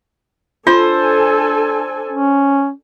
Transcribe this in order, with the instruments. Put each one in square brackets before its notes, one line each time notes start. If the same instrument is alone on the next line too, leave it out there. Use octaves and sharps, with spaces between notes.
[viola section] D4 A4 G#5 [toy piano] F4 [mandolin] C5
[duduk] C#4